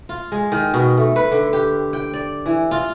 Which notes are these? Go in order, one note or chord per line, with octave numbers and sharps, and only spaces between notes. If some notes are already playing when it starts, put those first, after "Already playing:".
F4
G#3
D#3
B2
A3
B4
D3
G4
G5
D5
E3
F4